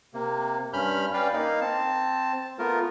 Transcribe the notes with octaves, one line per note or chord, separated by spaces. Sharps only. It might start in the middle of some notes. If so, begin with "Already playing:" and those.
C3 A#3
G2 C#4 B5 F6 G6
C#4 B4 D5 F5 G5
A#3 D#4 F5
C4 A5
A3 B3 F4 A#4